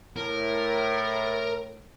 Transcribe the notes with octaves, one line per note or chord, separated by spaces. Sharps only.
A2 A#4